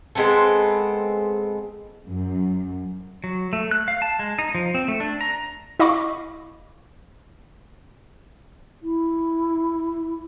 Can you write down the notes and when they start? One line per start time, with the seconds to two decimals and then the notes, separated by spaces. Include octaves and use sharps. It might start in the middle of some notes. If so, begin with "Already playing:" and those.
0.15 G#3 B3 C4 A4
2.05 F#2
3.24 F#3
3.53 A3
3.71 F#6
3.88 F5
4.02 A5
4.19 G#3
4.39 D#4
4.55 F3
4.75 C4
4.88 A3
5.00 D4
5.21 A#5
5.80 E4 D#5 F5 B5 C#6 D6
8.83 E4